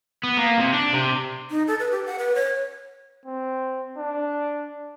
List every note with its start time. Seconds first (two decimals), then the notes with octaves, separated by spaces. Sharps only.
0.23 B3
0.37 A#3
0.59 C3
0.73 D4
0.94 C3
1.51 D#4
1.68 A4
1.80 B4
1.91 G4
2.06 F#5
2.19 B4
2.35 C#5
3.25 C4
3.98 D4